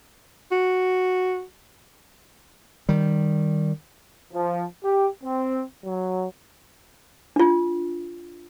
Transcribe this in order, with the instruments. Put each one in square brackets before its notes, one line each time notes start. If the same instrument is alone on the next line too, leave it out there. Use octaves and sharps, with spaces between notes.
[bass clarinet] F#4
[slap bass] D#3 G3
[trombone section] F3
G4
C4
F#3
[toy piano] D4 F4